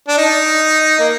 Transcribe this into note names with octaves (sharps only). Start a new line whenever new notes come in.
D4
D#4
A#3